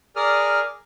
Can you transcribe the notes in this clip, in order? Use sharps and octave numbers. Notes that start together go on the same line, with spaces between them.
G#4 A#4 D5 D#6 F6